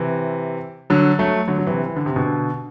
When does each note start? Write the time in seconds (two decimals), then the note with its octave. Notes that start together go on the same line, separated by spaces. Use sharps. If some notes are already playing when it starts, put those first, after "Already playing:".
Already playing: C3 E3
0.90 D3 F#3
1.19 F#3 A3
1.48 D3 F#3
1.58 F#3
1.66 C3 E3
1.86 E3
1.96 D3
2.06 C3
2.16 B2 D3